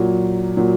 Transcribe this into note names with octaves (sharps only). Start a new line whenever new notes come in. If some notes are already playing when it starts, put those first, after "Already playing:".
Already playing: A#2 F#3
A#2 F#3